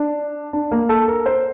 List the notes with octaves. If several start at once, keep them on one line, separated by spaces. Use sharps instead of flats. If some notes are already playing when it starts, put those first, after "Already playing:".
Already playing: D4
D4
A#3
A4
A#4
C5